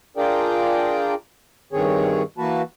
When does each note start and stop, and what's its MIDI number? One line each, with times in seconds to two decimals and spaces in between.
0.17 1.14 62
0.17 1.14 65
0.17 1.14 68
0.17 1.14 70
0.17 1.14 74
0.17 1.14 79
1.73 2.22 43
1.73 2.22 51
1.73 2.22 60
1.73 2.22 68
1.73 2.22 73
2.38 2.62 52
2.38 2.62 58
2.38 2.62 66
2.38 2.62 71
2.38 2.62 81